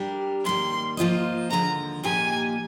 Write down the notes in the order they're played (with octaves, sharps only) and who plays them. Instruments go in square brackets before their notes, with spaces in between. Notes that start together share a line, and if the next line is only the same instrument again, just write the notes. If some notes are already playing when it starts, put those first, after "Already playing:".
Already playing: [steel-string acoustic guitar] G3 D4 G4 A#4
[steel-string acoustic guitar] D#2 D#3 G3 A#3 [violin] C6
[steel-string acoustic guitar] F3 A#3 F4 C5 D#5
[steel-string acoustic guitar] D#2 D3 F3 G#3 [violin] A#5
[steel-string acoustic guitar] A#2 F3 A#3 D#4 G4 [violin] G#5